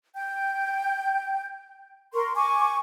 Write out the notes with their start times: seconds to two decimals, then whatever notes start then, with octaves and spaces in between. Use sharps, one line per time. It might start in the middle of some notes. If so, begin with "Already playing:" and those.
0.16 G5 G6
2.14 A#4 C6 C#6
2.35 G#5 C#6 D6